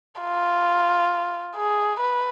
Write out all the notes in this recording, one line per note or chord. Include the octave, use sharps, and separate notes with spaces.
F4
G#4
B4